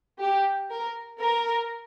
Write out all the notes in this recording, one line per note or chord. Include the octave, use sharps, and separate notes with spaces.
G4
A#4
A#4